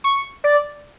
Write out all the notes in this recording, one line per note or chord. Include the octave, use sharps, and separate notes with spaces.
C#6
D5